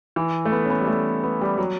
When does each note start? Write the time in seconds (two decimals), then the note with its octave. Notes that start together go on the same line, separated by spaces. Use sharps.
0.16 E3
0.45 A3
0.52 B3
0.65 C#4
0.70 B3
0.80 G3
0.87 A3
1.23 B3
1.41 G3
1.58 F#3